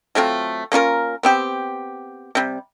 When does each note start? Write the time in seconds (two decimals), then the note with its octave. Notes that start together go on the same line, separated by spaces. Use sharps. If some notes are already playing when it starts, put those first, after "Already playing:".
0.15 F#3 A3 C4 F4
0.72 A#3 C#4 F4 A#4
1.23 B3 C4 G4
2.35 C3 G3